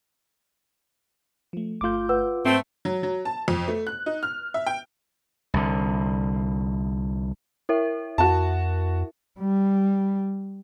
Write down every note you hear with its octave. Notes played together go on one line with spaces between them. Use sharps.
F3 A3
G1 A3 F4 D6 G6
B4 F#5 E6
G#2 A3 C4
F#3
F#3
A5
F2
A3
F#6
D#4
F6
E5
G5
C2 D3
E4 A#4 E5
F2 F#4 A5
G3